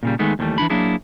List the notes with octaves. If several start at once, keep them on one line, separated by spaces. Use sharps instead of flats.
A#2 C#3 G3
D#3 G#3 A3 B3 D#4
D#2 D3 E3 G3 A3
E3 F3 D4 B5
F#3 A#3 D4 E4 G#4